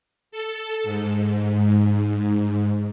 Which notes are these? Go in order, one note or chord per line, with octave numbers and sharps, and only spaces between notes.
A4
G#2